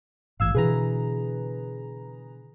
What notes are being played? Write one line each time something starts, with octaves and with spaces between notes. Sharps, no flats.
A1 G#2 F5 E6 G#6
B2 D3 E3 G#4 B4 A#5